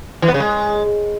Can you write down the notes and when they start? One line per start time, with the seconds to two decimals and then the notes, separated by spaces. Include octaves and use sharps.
0.22 E3
0.28 B3
0.34 C#3
0.40 G#3